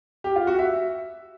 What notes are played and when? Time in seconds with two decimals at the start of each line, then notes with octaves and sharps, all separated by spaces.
0.24 G4
0.36 F4
0.47 F#4
0.59 E5